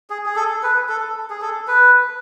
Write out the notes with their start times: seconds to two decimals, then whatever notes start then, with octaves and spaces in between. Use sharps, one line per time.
0.10 G#4
0.26 G#4
0.36 A4
0.63 B4
0.89 A4
1.30 G#4
1.42 A4
1.68 B4